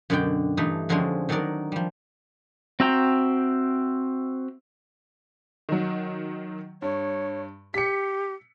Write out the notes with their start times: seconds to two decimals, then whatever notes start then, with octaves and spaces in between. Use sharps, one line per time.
0.10 F#2 B2 D3 D4 D5 G5
0.57 G2 E3 A3 D#4
0.89 F2 D3 F3 G#3 C4 C#4
1.29 D#3 F#3 D4 D#4 A#4 D5
1.72 F3 G3
2.80 C4 F#4 E5 G5 A#5
5.69 D#3 F#3
6.82 G2 C#5
7.74 G4 B6 C#7